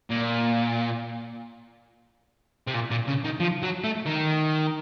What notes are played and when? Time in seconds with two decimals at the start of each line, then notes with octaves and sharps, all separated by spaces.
0.10 A#2
2.67 C3
2.74 A#2
2.90 A#2
3.07 C#3
3.24 D#3
3.40 F3
3.63 F#3
3.84 A3
4.06 D#3